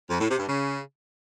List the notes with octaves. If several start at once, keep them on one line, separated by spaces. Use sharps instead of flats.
F2
A2
C3
G2
C#3